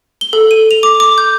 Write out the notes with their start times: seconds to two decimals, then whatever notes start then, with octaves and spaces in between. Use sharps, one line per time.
0.21 G7
0.33 A4
0.51 D#7
0.71 F7
0.83 D6
1.00 D6
1.18 G6